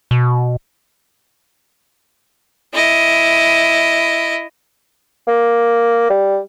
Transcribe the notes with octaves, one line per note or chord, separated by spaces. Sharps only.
B2
E4 D#5
A#3
G3